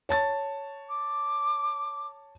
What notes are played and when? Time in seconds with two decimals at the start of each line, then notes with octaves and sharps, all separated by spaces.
0.09 C#5 A5 A6
0.89 D6